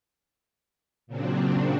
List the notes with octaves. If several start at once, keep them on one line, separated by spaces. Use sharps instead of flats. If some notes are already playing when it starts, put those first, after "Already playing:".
A#2 C#3 F#3 C4 D4